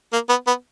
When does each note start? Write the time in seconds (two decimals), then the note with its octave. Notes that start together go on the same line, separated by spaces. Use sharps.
0.13 A#3
0.29 B3
0.47 B3